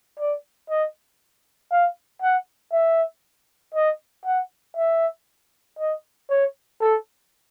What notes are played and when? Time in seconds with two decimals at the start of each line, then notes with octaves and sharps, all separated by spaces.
0.19 D5
0.70 D#5
1.72 F5
2.22 F#5
2.72 E5
3.74 D#5
4.25 F#5
4.76 E5
5.79 D#5
6.29 C#5
6.81 A4